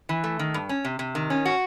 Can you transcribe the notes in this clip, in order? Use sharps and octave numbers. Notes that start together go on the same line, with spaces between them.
E3
A3
D#3
G2
C#4
C3
C3
D#3
C#4
F#4